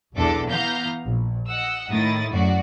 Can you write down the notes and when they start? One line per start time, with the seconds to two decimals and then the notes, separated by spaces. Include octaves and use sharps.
0.14 B1 E2 D4 A4 D6
0.50 E3 B3 F5 A#5 G6 A#6
1.05 A#1
1.48 D#5 F#5 E6
1.91 A2 D#3 E4 D#6 A6
2.31 F#2 A2 F#4 D5